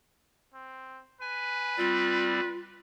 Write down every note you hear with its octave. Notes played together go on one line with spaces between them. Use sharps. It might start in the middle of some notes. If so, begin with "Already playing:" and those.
C4
B4 G#5
G3 C4 F4 D5